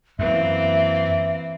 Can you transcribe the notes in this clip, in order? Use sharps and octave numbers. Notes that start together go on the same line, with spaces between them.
F#2 E3 A#3 C4 E5